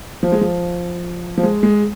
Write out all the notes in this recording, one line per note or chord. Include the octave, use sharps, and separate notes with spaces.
F3
G#3
F3
F3
G#3
G#3